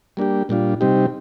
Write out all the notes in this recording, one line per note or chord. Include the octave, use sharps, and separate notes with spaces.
G3 A#3 D4 G4
A#2 G3 D4 F4
C3 G3 C4 D#4 G4